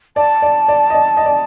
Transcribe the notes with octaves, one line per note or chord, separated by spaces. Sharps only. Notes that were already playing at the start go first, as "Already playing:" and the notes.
D5 A5
D5
D5
D#5
D5
D#5
D5